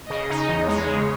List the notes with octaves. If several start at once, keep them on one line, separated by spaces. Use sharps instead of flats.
C#3 D#5
D#4
D#5
E2
G#3 C#5
C#3